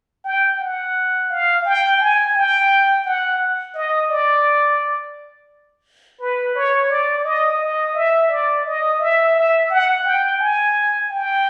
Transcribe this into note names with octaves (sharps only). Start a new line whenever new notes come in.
G5
F#5
F5
G5
G#5
G5
F#5
D#5
D5
B4
C#5
D5
D#5
D#5
E5
D5
D#5
E5
E5
F#5
G5
G#5
G5